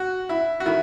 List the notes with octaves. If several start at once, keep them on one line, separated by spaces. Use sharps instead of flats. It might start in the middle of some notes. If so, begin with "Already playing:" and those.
Already playing: F#4
E4
F#4
D#3 E4